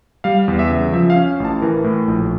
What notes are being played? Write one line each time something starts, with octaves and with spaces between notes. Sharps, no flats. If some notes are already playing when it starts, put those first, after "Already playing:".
G3 F5
E2
E5
C#3
F3 E5
F5
C#4
A1 A5
E3 A#4
A2
A#1